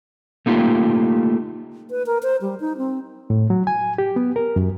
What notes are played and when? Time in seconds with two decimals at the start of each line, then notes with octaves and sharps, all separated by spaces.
0.46 A3 A#3 D#4 F4 G4
1.90 B4
2.06 A#4
2.23 C5
2.41 G3
2.60 D#4
2.77 C4
3.30 A2
3.50 F#3
3.67 G#5
3.98 G4
4.16 B3
4.36 A#4
4.56 F#2